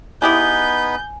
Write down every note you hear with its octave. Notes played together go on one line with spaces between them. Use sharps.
B3 D#4 E4 G4 G#4 B4 G#5 G6